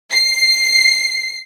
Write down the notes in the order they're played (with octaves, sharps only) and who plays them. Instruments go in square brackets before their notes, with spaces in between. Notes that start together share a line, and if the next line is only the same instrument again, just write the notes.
[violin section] C7